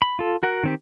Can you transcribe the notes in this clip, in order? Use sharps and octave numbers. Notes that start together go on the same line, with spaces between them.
B5
F4 A4
F#4 A#4 F#5
D#3 C4 G4